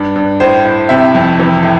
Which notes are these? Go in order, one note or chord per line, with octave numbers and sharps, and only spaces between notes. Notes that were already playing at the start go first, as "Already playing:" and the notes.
Already playing: G2 D5
G2
A2 C5
A2
C3 E5
F2
E3
A2